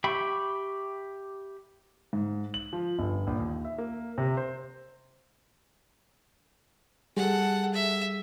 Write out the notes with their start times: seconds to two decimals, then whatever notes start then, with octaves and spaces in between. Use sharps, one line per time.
0.04 G4 E5 G5 B5 C#6
2.13 G#2
2.54 F#7
2.73 F3
2.99 G1
3.27 A#1
3.39 D#2
3.65 E5
3.78 A#3
4.18 C3
4.37 C5
7.17 G3 G#4 A4 F#5
7.74 E5